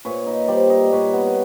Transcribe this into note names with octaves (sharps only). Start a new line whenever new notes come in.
A#2 B4 C#5
D#4
G3 C5 D5
D#4
A#2 B4 C#5
B3
B4